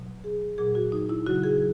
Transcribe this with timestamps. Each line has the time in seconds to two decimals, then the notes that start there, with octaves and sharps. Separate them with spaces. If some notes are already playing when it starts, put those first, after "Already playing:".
Already playing: B2 F#3
0.24 G#4
0.58 A#2 F#3 G#4
0.75 F#4
0.92 D#4
1.09 E4
1.26 C#3 F#3 F#4
1.44 G#4